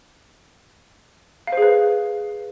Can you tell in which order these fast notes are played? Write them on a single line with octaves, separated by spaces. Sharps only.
F5 C5 G#4 B4